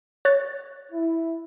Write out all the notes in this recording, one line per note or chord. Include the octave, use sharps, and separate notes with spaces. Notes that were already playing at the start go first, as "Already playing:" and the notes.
C#5 F#6 A6
E4